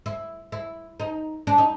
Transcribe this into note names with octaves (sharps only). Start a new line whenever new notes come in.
E4
E4
D#4
D4
D#4